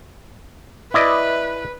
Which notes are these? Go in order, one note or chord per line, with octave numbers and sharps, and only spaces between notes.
E4 B4 D5 D#5